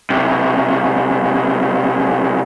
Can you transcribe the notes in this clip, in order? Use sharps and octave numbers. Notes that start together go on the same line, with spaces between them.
B1 C3